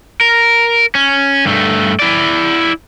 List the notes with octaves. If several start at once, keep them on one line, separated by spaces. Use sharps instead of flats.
A#4
C#4
G2 A3
E4 D5